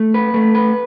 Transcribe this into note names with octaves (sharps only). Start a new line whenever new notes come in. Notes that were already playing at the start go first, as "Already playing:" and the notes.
Already playing: A3
B4
A3
B4